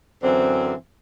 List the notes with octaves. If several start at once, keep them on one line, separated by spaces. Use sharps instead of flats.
F#2 D3 E3 C4